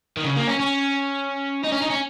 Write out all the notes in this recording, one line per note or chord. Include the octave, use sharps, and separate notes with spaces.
D#3
C#3
A#3
C#4
C#4
D#4
C#4
D#4
C#4